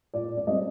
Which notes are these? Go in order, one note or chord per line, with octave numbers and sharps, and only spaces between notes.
A#2 D5
D5
G3 C4 D#5